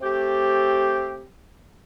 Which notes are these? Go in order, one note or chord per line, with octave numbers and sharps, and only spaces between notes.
A3 C4 G4